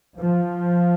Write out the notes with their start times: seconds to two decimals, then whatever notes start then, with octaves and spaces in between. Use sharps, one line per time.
0.18 F3